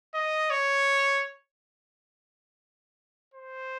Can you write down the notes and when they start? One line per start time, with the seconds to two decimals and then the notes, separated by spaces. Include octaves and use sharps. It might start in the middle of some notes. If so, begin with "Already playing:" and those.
0.14 D#5
0.50 C#5
3.34 C5